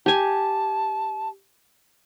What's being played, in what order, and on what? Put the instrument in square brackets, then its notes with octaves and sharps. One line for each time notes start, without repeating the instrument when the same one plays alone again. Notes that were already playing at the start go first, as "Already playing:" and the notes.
[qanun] G4 G#5 [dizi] A5